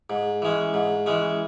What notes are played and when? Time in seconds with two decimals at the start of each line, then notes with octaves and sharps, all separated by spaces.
0.10 G#2
0.42 E3 G#3 C#4
0.74 G#2
1.06 E3 G#3 C#4